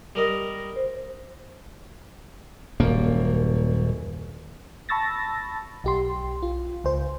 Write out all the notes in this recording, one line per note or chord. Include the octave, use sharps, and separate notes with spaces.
G3 A#4 D#5
C5
D#1 F#2 A#3
A5 B5 C#6 E6 A6 A#6
B1 G4 C6
F4
C#2 C5